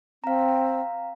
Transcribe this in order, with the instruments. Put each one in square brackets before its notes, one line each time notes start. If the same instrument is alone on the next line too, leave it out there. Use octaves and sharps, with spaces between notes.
[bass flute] C4 [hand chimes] F5 A#5